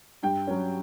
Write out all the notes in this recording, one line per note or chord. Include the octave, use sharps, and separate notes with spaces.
G2 G5
F#3 C#4